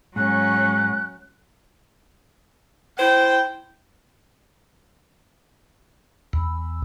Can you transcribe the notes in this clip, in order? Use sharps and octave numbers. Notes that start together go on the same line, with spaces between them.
G#2 F#3 C#4 F#6
E4 C5 G5
E2